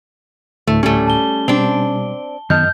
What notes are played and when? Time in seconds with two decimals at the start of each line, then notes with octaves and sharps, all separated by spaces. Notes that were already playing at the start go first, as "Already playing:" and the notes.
0.67 D2 A2 A3
0.83 G3 A3 C#4 G#5
1.07 A5 G7
1.48 B2 G3 C4 D4
2.50 F#2 D#3 B3 D#5 A5 F6 G6